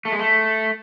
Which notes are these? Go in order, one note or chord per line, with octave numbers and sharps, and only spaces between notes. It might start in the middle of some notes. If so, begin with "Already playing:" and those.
A3
G#3
A3